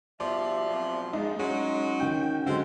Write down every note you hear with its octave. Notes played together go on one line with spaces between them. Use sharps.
B2 F3 G3 D5 E5
B2 F#3 C4
G#3 D4 D#4 F4
F#3 G#3 C#4 D#4 D#5
D#3 F#4 G5
D3 F#3 G#3 C4